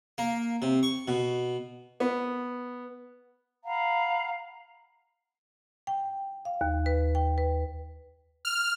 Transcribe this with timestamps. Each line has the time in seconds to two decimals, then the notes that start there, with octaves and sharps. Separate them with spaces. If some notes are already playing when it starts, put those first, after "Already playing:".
0.18 A#3
0.62 C3
0.83 C#6
1.08 B2
2.00 B3
3.64 F5 F#5 A#5 B5
5.87 G5
6.45 F5
6.61 D#2
6.86 B4
7.15 G5
7.38 B4
8.45 F6